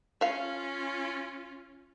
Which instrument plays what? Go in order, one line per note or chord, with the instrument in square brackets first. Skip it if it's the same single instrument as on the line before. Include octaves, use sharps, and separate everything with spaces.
[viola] C#4 F4 [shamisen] E5 F5